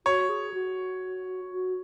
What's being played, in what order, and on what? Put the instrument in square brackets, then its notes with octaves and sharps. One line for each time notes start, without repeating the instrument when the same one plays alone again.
[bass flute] F#4 [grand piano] C#5
[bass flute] G#4
F#4
F#4